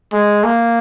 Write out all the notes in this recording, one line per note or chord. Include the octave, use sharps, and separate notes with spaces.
G#3
A#3